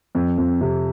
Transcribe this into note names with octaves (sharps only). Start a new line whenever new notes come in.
F2
F2
C3